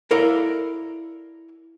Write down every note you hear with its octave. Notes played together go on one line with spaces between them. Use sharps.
E4 A4 A#4 D5 F5